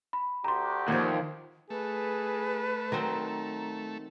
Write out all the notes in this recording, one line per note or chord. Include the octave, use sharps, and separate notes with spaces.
B5
D2 F#4 G4 A#5 C6
D#2 F3 A#3
A3 G#4 B4
D#3 F#3 C4 A#5